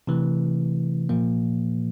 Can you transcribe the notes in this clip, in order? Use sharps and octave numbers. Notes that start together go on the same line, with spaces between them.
C3 E3 A3
A#2 F3 A#3